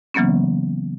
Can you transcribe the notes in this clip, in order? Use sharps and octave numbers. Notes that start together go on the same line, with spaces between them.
C#3 E3 F#3 A#3 B3 C#4